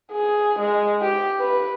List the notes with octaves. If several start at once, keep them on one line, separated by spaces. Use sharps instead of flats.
G#4
G#3
G4
B4